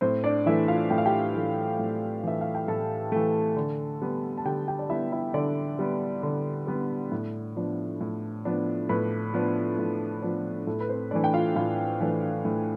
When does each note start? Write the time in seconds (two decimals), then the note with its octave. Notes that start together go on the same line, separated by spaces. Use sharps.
0.01 A2 C4 C5
0.24 D4 D5
0.46 E3 A3 E4 E5
0.68 F4 F5
0.90 A2 G5
0.98 F5
1.06 G4 G5
1.35 E3 A3
1.79 A2
2.23 E3 A3 E5
2.41 F5
2.55 G5
2.68 A2 A4 A5
3.12 E3 A3
3.57 D3
4.02 G3 B3
4.38 A5
4.45 D3 G4 G5
4.68 G4 G5
4.79 D5
4.89 G3 B3 E4 E5
5.12 E4 E5
5.34 D3 D4 D5
5.79 G3 B3
6.23 D3
6.67 G3 B3
7.12 A2
7.56 F3 B3 D4
8.01 A2
8.45 F3 B3 D4
8.89 A2 B4
9.34 F3 B3 D4
9.79 A2
10.22 F3 B3 D4
10.67 A2 A4
10.80 B4
10.89 C4 C5
11.11 E3 A3 D4 D5
11.24 G5
11.34 F4 F5
11.55 A2 F4 F5
12.00 E3 A3 D4
12.45 A2